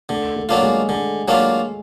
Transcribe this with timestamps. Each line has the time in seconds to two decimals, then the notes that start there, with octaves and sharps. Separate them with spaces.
0.09 D3 A3
0.36 A3
0.49 F#3 A#3 D4 F4
0.63 G#3
0.89 D3 G#3
1.28 F#3 A#3 D4 F4